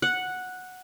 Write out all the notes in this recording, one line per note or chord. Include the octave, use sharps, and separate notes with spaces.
F#5